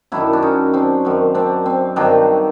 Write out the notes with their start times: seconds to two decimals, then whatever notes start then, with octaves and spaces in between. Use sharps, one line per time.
0.12 F#2 D#3 F#3 D4 E4
0.33 D4
0.42 C#4 D#4
0.74 C4 D4
1.05 F#2 D#3 F#3
1.34 C4 D4
1.66 C4
1.96 G2 D#3 F#3 C4 D4